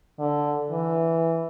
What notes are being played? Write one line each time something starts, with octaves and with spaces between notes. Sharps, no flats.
D3
E3